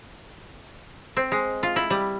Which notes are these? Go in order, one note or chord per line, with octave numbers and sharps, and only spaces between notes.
C4
G#3
F4
E4
G3